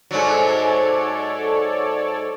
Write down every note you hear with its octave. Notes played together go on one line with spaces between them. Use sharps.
G#2 F#3 A4 C#5 D5